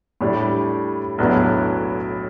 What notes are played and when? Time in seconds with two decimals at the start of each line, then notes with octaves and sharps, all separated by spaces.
0.21 A2 G3 D4
1.18 B1 A2 F#3 B3 D4